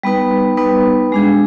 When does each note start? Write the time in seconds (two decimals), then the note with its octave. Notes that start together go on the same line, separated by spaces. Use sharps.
0.03 G3 B3 D#4 B4
0.57 G3 B3 D#4 B4
1.12 G#3 D4 G#4